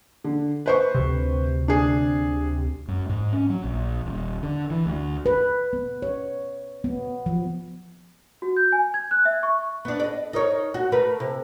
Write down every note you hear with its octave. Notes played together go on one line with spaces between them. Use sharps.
D3
B4 C5 C#6
D2 C3
D4 G#4
F#2
G#2
C#4
F#3
A#1
D#1
D3
E3
D2
B4
B3
C#5
B3
F3
F#4
G6
G#5
G#6
F#6
E5
C#6
B3 D4
D5 D#5
D#4 A#4 C#5
F#4
A3 A#4 B4
C3